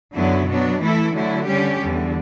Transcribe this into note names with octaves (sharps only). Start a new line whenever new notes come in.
F#2 D3 F#3 B3 E4
B2 F#3 B3 D4
E3 A3 E4 A4
D3 F#3 A3 E4
D3 G3 C#4 G4
E2 D3 G3